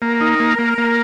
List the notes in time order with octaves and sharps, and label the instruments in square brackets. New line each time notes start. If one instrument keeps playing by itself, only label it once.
[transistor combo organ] A#3 [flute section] A#4
[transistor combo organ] D#4
A#3
A#3
A#3